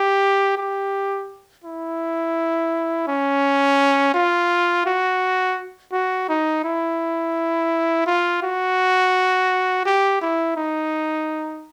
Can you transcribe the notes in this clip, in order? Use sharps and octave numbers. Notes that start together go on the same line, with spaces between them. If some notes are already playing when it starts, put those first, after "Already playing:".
Already playing: G4
G4
E4
C#4
F4
F#4
F#4
D#4
E4
F4
F#4
G4
E4
D#4